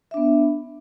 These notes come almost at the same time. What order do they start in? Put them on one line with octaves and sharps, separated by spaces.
E5 D4 B3